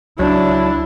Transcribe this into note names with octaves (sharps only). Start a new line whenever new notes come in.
C#2 F#3 D4 E4